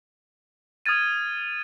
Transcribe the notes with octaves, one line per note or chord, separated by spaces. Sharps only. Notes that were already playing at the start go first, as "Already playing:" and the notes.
D#6 F6 G#6 A6 D#7